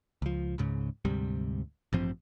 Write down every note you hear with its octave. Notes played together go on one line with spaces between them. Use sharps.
C#2 F3
C#2 G#2 C#3
D2 G#2 C3 G3
A1 G2 F3 C4